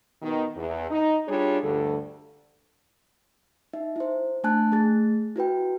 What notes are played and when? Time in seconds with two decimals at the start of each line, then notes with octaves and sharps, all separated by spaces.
0.22 B2 D#3
0.55 E2
0.90 D#4
1.27 G3 D4 F4 G#4 C#5
1.62 D2 G2 D3 G3 A4
3.73 D#4 E5
3.96 E4 C5
4.44 A3 D4 G#5 A5 F#6
4.72 A3 G#4 A6
5.36 E4 F#4 B4 G5